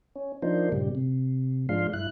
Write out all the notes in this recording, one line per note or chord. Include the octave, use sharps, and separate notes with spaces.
C#4
F3 A#3 D4 D#4 C5
G2 A#2 C#3 G3
C3
G#2 F3 G#3 D4 F5 C6
G2 E4 F#6